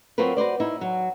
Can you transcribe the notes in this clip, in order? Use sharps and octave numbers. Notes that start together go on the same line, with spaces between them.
F#3 C4 F4 F#4 A#4 B4
F#4 B4 C5 D5
D#4 E4
F#3